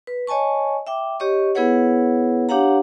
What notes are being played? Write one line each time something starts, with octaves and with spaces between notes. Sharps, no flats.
B4
C#5 D#5 G#5 A5 C#6
E5 G5 D6
G4 C#5 D#5 C#6
B3 E4 G#4 B4 C#5 F#5
D4 G4 C#5 F5 F#5 A#5